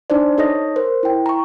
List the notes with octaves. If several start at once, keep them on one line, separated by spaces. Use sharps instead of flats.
D4 D#4 C5 D5
D#4 A4 C#5 D#5 D#6 A#6
A#4 C5
E4 G5
A#5 C#6